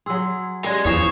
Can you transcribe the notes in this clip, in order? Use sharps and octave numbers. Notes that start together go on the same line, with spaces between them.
F#3 G#4 C6 E6
G#3 C#4 G4 D5 G#6
E2 E3 F3 C#5 D#6 C7 E7